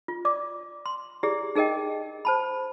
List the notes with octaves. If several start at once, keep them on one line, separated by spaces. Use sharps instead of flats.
F4
D5 D6
C6
E4 G4 G#4 D5
D#4 G#4 A#4 D#5 G5
C5 A5 B5